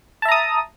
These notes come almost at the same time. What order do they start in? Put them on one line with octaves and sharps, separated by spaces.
A5 E5 A#5 D#6